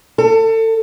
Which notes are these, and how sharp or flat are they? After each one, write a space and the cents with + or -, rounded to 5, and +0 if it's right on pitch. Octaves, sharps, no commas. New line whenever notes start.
A4 +30